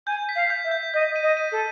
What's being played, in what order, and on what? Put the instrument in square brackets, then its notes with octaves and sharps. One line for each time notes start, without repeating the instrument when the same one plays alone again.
[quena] G#5 [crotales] G6
[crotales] B6
[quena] F5
[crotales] G6
[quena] E5
[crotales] G6
[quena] D#5 [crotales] G6
[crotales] D#7
[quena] D#5
[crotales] D#7
[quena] A4